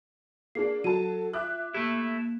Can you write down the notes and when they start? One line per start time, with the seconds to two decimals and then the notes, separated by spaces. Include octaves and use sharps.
0.55 A#3 D4 G#4 C7
0.84 F#3 A4 A5 D#7
1.33 F4 E5 D6 F#6
1.74 A3 A#3 E4 G4